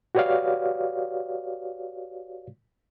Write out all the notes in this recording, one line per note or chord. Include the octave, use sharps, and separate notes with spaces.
F#4 G4 B4 C#5 D5 F5